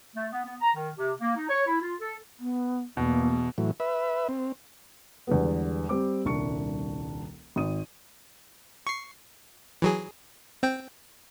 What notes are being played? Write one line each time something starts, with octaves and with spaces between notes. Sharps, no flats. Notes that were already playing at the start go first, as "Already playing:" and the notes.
A3
B3
B3
A#5
D#3
C3
A#3
D#4
C#5
E4
F4
A4
B3
E2 B2 A#3
A2 E3 F#3
B4 E5
C4
E2 D3 G3 G#3 B3
G3 C4 D6
D#1 C2 D4 C#6 C#7
G#1 D#6 D#7
C#6 C7
E3 F#3 G#4
C4 G5